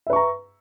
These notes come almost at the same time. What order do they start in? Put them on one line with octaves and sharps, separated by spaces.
E5 B4 C#6 A#5